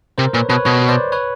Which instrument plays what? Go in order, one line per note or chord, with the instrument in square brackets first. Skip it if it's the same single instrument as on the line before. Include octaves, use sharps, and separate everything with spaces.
[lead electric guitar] C3 [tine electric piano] A#4 C5
[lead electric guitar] A#2 [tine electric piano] B4 C#5
[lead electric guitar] B2 [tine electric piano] B4 C#5
[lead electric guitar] B2 [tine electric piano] B4 C#5
[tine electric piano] C5 D5
B4 C#5